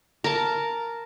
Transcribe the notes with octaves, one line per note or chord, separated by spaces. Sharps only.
A#4 A5